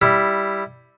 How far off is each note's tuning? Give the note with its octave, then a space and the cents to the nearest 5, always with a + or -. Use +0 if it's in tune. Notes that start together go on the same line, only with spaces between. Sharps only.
G3 +0 E4 +0